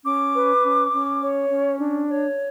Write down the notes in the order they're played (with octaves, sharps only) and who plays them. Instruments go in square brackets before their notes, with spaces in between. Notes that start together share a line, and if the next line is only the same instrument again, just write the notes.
[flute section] C#4 D6
B4
C#4
C#4
C#5
C#4
D4
C#5